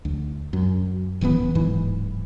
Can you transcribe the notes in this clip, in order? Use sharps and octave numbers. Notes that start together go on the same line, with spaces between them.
D2
F#2
D1 D#3 E3 B3
D1 G#2 E3